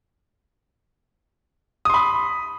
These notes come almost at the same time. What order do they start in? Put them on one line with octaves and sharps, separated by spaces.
D#6 C6 B5